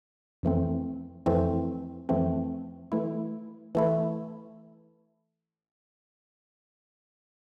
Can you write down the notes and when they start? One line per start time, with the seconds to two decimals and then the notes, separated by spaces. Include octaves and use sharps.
0.43 F2 E3 A3 C4
1.26 F2 E3 A3 C4
2.09 F2 E3 A3 C4
2.92 E3 A3 E4
3.75 E3 A3 E4